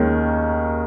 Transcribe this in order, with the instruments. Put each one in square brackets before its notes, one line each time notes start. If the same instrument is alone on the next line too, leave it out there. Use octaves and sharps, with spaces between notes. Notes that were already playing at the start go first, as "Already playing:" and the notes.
Already playing: [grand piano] D#2 D#3 G#3 C#4